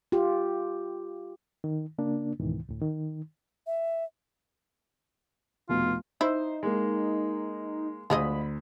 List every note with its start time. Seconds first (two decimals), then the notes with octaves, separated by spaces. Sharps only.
0.12 F4 G4
1.64 D#3
1.98 C#3 A#3 D4
2.40 C#2 G#2 B2 D#3 E3
2.69 D2 A2
2.82 D#3
3.66 E5
5.69 F1 B2 F4
6.21 D#4 E4 C5
6.63 G#3 A#3
8.10 D2 F3 G#3 D#5 B5